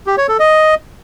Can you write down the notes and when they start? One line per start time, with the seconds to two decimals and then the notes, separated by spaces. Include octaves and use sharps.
0.07 G4
0.18 C#5
0.29 A4
0.39 D#5